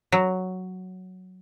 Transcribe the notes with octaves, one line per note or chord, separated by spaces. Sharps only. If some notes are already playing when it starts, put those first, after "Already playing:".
F#3